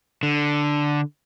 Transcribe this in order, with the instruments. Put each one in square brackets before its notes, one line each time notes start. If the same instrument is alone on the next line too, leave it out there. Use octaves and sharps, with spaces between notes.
[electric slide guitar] D3